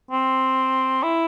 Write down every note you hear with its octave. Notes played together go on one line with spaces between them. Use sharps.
C4
E4